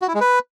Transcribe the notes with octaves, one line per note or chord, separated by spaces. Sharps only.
F#4
E4
G#3
B4